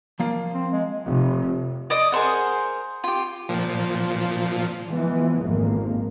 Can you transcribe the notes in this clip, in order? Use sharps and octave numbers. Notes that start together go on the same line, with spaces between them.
F3 A#3 F5
C4
G#3
F1
D5 D#5 D#6
G#4 A#4 C5 F#5
F4 G4
A#2 F3
E3 F3 G#3 B3
G#1 F2 A#2 A#3